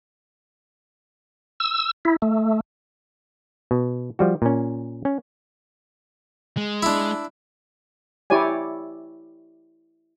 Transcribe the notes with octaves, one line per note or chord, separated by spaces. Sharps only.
E6
E4
A3
B2
F3 G3 F#4
A#2 C#4
C#4
G#3
D4 E4
E4 G4 C#5 D5 G#5